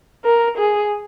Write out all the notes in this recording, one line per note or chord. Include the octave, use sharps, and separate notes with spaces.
A#4
G#4